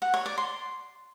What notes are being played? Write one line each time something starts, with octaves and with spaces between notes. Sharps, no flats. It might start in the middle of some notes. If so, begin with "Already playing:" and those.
F#5
C#5
D5
C6